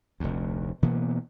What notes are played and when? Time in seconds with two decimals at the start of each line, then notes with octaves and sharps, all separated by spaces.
0.20 F1 D2
0.82 B2 E3 A#3 B3